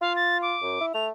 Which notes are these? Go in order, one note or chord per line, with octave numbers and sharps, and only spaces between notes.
F4 F5
A6
D6
F#2
E4
A3 F7